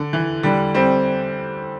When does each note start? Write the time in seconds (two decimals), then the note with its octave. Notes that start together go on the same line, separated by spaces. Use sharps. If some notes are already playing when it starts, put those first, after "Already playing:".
Already playing: D3
0.13 E3
0.43 D3 G3
0.74 G3 C4